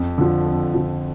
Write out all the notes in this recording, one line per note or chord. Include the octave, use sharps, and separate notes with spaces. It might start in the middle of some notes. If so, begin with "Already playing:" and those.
Already playing: F2
D3 F3
F2
D3 F3